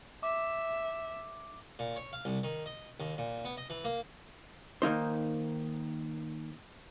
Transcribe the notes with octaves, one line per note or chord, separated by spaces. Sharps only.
E5 D6
A#2
C#5
F5
C2
D#3
D#5
D#2
A#2
B3
D#5
E3
A#3
D#3 A#3 D#4 C5